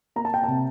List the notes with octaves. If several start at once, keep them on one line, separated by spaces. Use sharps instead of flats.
A#3 A#5
A5
G5
C3 A5